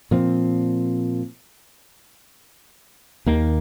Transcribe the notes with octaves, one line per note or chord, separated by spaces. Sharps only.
A#2 F3 C4
D#2 D#3 A#3